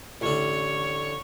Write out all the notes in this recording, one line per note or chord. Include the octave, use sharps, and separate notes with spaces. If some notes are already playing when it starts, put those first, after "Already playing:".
A1 D3 C#5